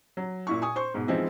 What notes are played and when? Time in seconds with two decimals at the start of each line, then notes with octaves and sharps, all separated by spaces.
0.17 F#3
0.47 A#2 E4 C#6
0.62 G#5 C#6 D#6
0.76 C5 C#6
0.94 G#2 B2
1.08 E3 F3 G#3 C4 D#4 E4